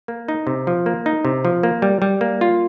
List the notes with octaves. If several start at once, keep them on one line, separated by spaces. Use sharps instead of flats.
A#3
D#4
C3
F3
A#3
D#4
C3
F3
A#3
G3
G3
A#3
F4